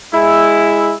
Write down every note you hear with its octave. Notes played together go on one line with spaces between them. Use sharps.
G#3 E4